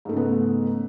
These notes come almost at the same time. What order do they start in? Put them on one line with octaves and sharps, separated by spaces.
G#2 A3 C#3 B3